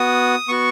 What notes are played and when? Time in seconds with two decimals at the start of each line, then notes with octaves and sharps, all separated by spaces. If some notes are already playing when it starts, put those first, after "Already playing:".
Already playing: B3 F#4 D#6
0.48 B3 F#4 C#6